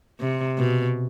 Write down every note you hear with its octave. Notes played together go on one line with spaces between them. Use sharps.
C3
B2